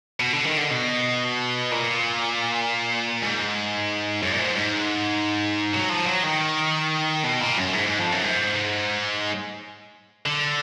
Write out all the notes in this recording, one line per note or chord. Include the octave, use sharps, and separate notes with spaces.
B2
D3
D#3
D3
B2
A#2
G#2
F#2
A#2
G#2
G#2
F#3
F3
F#3
D#3
B2
A#2
F#2
G#2
G#2
F2
F#2
G#2
D3